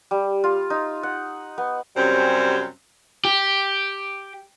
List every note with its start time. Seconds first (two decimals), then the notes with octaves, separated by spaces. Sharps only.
0.11 G3
0.44 F4
0.70 D#4
1.03 F#5
1.58 B3
1.96 F#2 C3 G3 C4 C#4 C5
3.25 G4